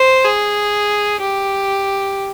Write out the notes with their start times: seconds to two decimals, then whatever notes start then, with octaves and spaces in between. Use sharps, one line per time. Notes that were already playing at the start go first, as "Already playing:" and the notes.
Already playing: C5
0.25 G#4
1.21 G4